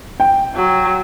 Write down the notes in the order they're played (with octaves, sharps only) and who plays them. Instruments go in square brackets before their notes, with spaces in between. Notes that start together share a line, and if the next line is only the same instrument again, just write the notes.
[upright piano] G5
[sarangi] F#3